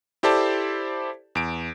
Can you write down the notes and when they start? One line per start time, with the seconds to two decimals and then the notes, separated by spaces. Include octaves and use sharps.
0.23 E4 G4 A4 C5 D5 A5
1.35 E2 D7